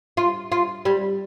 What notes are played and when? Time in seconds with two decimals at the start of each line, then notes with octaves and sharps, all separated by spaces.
0.17 F4
0.52 F4
0.85 G3